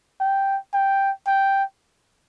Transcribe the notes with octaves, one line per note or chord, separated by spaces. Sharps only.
G5
G5
G5